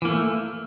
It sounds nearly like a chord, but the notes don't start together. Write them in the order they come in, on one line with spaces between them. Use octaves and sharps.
E3 A#3 A3